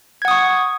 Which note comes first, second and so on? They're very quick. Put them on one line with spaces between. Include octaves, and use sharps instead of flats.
G#6 F#5 D#6 C#6